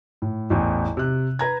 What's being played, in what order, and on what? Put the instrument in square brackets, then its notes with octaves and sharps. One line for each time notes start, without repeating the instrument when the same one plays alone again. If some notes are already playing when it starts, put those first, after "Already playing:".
[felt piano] A2
A1 E2
C3 F#6
B4 A#5 G#6